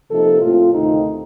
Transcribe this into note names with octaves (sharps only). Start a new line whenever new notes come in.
C3 F3 A#3 D#4 A4
A2 A3 C4 F4
D2 C3 D#3 A3 C4 D#4